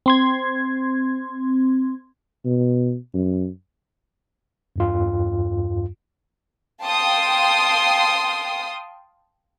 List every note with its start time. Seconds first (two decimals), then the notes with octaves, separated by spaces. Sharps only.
0.06 C4 C6 G#6
2.45 B2
3.14 F#2
4.76 E2 G2 F4
6.82 F5 G5 A5 C6 D#6